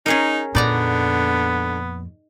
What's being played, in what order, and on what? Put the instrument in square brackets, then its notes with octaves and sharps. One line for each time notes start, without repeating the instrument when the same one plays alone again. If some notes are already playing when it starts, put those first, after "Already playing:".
[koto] C#4 G#4 A#4 [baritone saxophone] D#4
[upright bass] F2 A#2 [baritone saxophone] D3 [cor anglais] B3 [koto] D#4 D5 A#5